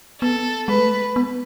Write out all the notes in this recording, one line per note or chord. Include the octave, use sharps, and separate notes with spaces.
B3 A4
G#3 B4
A3
G#3
B3